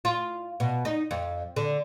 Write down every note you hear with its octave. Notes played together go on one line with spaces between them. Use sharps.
F4
B2
D#4
F2
D3